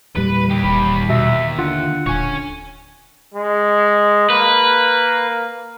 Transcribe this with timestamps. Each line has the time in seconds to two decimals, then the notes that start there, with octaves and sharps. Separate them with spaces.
0.16 E2 A#2 G3 B4
0.49 D#2 G4
0.64 D#1 B5
1.09 D#2 B2 E5
1.59 D3 F4 F#5
2.06 D#1 C#5 G#5
3.34 G#3
4.30 A#3 B4